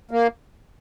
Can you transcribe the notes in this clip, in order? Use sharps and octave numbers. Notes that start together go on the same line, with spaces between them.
A#3